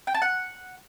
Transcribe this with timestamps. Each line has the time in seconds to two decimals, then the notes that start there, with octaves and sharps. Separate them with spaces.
0.07 G5
0.14 A5
0.22 F#5